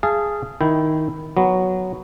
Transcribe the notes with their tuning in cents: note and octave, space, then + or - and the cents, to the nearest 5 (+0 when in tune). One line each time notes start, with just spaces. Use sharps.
G#4 +0 F5 -30 A5 +0
D#3 +10 E4 +0 G5 -15
F#3 +0 B3 +0